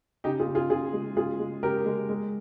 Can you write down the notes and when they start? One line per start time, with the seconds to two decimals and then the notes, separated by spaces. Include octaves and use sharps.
0.24 C#3 D#4 G4
0.40 F4 G#4
0.48 C#3
0.55 F4 G#4
0.70 C#3 F4 G#4
0.93 G#3
1.16 C#3 F4 G#4
1.40 G#3
1.63 C#3 G4 A#4
1.86 G#3
2.09 G#3